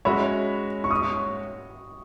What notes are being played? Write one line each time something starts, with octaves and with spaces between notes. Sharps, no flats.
G#3 C#4 F#4 C#5 E5 B5
C#6
D#6
C#6